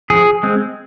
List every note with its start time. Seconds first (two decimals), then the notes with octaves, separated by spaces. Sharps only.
0.10 F3 G#4
0.43 G#3 C4